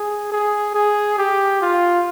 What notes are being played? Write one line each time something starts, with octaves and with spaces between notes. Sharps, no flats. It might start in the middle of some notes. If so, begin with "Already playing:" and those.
Already playing: G#4
G#4
G#4
G4
F4